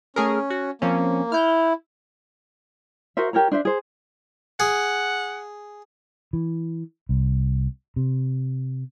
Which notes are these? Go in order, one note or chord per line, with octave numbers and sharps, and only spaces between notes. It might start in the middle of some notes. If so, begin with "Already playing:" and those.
A3 C#4 G#4 A#4
F#4
F3 A#3 C4 C#4
E4 F6 G6
F#4 A#4 C5 E5
G4 A#4 C#5 A#5
D4 C5 E5
G#4 C5
G#4 F#5
E3
C2
C3